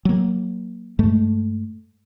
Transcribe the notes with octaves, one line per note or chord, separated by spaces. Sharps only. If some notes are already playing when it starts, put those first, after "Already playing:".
F#3 A#3
G2 G#3 A3